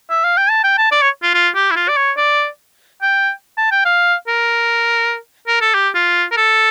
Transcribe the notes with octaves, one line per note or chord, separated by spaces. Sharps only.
E5
F5
G5
A5
G5
A5
D5
C#5
F4
F4
G4
E4
F4
D5
C#5
D5
G5
A5
G5
F5
A#4
A#4
A4
G4
F4
A#4
A4